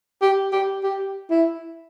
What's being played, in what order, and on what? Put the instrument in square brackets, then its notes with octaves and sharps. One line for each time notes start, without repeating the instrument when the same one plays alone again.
[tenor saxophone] G4
G4
G4
E4